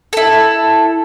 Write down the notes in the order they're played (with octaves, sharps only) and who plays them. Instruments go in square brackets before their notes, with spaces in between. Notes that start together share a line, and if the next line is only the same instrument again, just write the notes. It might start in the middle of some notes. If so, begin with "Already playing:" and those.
[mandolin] E4 A4